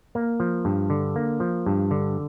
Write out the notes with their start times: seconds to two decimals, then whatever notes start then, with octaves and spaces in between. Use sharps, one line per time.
0.15 A#3
0.40 F3
0.65 G2
0.90 D3
1.16 A#3
1.40 F3
1.66 G2
1.91 D3